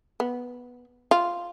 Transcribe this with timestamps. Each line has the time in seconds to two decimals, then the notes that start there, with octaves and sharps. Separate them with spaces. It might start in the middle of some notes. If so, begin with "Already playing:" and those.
0.20 B3
1.11 F4